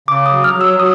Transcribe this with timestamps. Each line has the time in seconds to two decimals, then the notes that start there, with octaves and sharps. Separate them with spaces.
0.08 C#3 D6
0.26 D#6
0.32 F#3
0.44 F6
0.56 F#3
0.61 E6
0.79 F#3 D#6